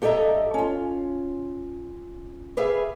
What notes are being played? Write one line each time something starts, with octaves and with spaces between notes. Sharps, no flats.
G2 G4 A4 D#5 E5 A#5
C#4 F4
G4 G#4 B4 E5 F5